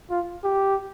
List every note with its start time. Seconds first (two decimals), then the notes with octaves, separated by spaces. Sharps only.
0.10 F4
0.44 G4